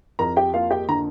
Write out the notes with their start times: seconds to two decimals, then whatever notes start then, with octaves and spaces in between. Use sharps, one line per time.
0.19 F2 A#4 A#5
0.37 G4 G5
0.54 A#3 F4 F5
0.71 G4 G5
0.88 D3 A#5